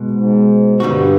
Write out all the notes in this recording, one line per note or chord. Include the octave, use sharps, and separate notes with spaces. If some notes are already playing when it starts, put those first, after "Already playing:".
Already playing: B2 G#3 B3
G#2
G2 D3 G3 B3 D#4 F#4